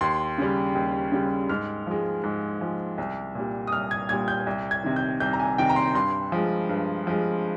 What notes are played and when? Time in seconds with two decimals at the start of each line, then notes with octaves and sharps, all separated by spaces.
0.01 D#2 C6
0.38 C#3 G3
0.75 D#2
1.12 C#3 G3
1.49 G#2 F6
1.87 F3 G#3
2.23 G#2
2.61 F3 G#3
2.98 C2
3.35 A#2 G3
3.67 D#6
3.72 C2 F6
3.91 G#6
4.09 A#2 G3 G#6
4.28 G6
4.47 C2
4.71 G#6
4.84 C3 D#3
4.96 G6
5.20 C2 G6
5.33 A#5
5.40 G#5
5.58 C3 D#3 G5
5.69 A#5
5.76 C6
5.95 G2 C6
6.32 F3 G#3
6.69 G2
7.07 F3 G#3